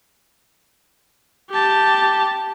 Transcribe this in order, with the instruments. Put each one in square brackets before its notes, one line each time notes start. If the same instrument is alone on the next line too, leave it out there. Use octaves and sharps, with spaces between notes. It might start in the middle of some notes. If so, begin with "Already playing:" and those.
[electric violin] G4 A5